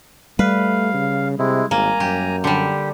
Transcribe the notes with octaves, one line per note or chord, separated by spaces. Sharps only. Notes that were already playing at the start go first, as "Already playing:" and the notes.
G3 A3 B4 F5
C#3
C3 G#3 E4
G#1 A#3 G#5 A#5
F#2 G4
D3 G3 G4